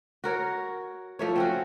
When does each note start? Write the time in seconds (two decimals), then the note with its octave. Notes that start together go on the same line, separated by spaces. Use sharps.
0.24 F#4 A#4 C#5
1.19 F3 A3 C#5
1.36 C4 C#4 F#4